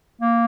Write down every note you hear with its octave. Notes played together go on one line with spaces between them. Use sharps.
A#3